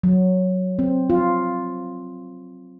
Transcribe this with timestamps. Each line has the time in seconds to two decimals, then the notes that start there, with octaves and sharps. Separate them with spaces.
0.03 F#3
0.79 C4
1.10 F4